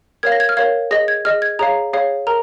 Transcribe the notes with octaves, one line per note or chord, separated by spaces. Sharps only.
A#4 C#5 F5 G#6
A#6
G#6
F6
A#4 C#5 F5 G#6
G#4 D#5 A#6
G#6
G#4 D#5 F6
G#6
G#4 C#5 F5 A#5
G#4 C#5 F5
A#4 A#5